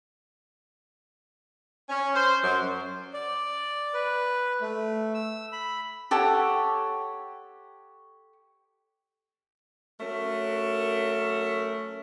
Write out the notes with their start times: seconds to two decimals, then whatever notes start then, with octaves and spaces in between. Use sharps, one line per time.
1.90 C#4
2.16 C5
2.42 F#2
3.13 D5
3.94 B4
4.61 A3
5.14 E6
5.53 B5
6.11 G4 A4 C#5 F#5
10.00 F#3 A3 C#4 A#4